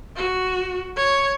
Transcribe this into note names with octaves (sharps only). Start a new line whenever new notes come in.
F#4
C#5